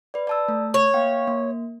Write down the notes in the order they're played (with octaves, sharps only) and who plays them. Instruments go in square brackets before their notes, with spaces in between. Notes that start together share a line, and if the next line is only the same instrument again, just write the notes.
[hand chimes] B4 D5
D5 A5 E6
A3
[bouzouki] C#5
[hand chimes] A#3 F5 G5
A#3